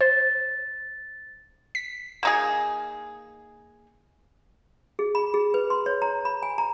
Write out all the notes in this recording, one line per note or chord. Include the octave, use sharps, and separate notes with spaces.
C5 A6
B6
A#3 D#4 G#4
G#4
B5
G#4
B4
C6
C#5
A#5
B5
G#5
A#5